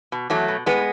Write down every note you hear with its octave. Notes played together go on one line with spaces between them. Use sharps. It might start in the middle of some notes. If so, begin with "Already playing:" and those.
B2
E2 F#3 A3
B2
A2 G#3 B3